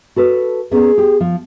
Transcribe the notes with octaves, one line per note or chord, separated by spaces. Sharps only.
F#4 A4 B4
A#3 B3 C#4 G#4
G4
F3